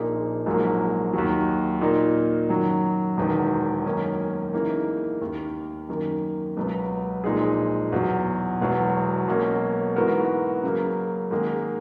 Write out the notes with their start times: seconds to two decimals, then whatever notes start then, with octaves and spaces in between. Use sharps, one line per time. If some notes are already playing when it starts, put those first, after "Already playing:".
Already playing: A#1 A#2 A#3 D#4 G#4
0.46 A#1 G#2 F#3 A#3
1.13 D#2 D#3 F#3
1.81 A#2 A#3 D#4
2.49 F#2 D#3 F#3
3.17 E1 E2 D#3
3.85 F#2 D#3 A#3 C#4
4.53 C#3 E3 A#3 D#4
5.21 D#2 D#3 A#3
5.89 F#2 D#3 A#3
6.57 C#2 B2 F#3 B3
7.24 A#1 A#2 G#3 D#4 G#4
7.92 E2 B2 F#3
8.60 E1 E2 B2 F#3 B3
9.28 B1 B2 A#3 C#4
9.96 G#2 E3 B3 F#4 A#4
10.64 C#3 F#3 A#3
11.31 G#2 D#3 A#3 D#4 G#4